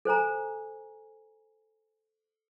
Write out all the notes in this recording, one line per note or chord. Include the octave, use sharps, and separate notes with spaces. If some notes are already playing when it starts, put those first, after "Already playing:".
A4 C5 G#5 A#5